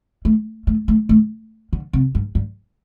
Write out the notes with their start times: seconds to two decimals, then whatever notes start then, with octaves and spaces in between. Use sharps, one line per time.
0.25 A3
0.67 A3
0.88 A3
1.09 A3
1.73 D3
1.93 C3
2.15 G2
2.35 G2